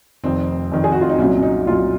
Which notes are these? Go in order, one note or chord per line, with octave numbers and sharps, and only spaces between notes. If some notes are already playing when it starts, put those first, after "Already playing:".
F1 F2 D#3 C4
F1 F2 D#3
G#4
F#4
F4
D#4
C2 A#2 F#3 C#4
C#4
D#4
C2 A#2 F#3 F4